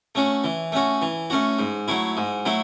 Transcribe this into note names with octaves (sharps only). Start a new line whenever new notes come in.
A3 C#4 F#4
E3
A3 C#4 F#4
E3
A3 C#4 F#4
G#2
F#3 A3 E4
G#2
F#3 A3 E4